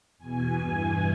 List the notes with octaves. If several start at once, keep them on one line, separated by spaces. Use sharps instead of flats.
E2 B2 G#5
G2 E3 G#5